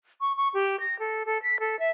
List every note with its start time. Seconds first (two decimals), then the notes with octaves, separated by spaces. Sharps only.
0.21 C#6
0.37 C#6
0.54 G4
0.80 A#6
0.99 A4
1.26 A4
1.43 B6
1.60 A4
1.79 E5